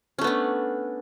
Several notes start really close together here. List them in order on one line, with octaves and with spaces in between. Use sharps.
C#4 A3 B3 D4